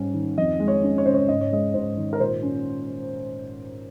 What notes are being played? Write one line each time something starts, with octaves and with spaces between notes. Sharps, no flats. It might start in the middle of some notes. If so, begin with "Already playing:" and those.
Already playing: G#2 G3 C#4
D#3
F2 D#5
G#3
C#5
C#4
C#5
C#3 C5
C#5
G#2 D#5
C#5
G#3 D#5
G#2 C5
D#3
A#4
A#2 C5
C#4